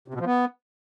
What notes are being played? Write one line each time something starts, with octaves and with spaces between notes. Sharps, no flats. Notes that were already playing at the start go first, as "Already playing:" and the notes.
C3
B2
F3
B3